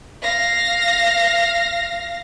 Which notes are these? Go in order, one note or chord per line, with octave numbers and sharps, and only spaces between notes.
F5 A#6